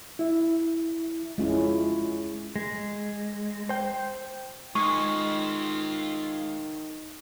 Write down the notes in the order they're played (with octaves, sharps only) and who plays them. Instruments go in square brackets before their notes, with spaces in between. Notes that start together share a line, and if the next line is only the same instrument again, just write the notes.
[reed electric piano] E4 E5
[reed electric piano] F2 F4 [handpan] G#3 C#4 E4
[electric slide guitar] G#3
C5 G5
[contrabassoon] D#3 [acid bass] G#3 [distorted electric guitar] F4 D#5 [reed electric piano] C#6